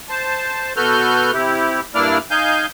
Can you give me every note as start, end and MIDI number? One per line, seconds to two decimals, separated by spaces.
0.09 0.73 72
0.09 0.73 81
0.77 1.31 47
0.77 1.31 66
0.77 1.31 69
0.77 1.31 71
0.77 1.31 89
0.77 1.31 91
1.33 1.80 48
1.33 1.80 64
1.33 1.80 67
1.95 2.18 43
1.95 2.18 58
1.95 2.18 62
1.95 2.18 64
1.95 2.18 74
1.95 2.18 89
2.31 2.66 63
2.31 2.66 77
2.31 2.66 80
2.31 2.66 91